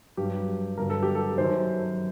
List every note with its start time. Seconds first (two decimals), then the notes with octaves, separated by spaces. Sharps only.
0.17 G2 F#3 G4
0.78 G2 D3 F#3 A#4
0.90 A4
1.03 G4
1.15 A4
1.38 F#2 D#3 F#3 C5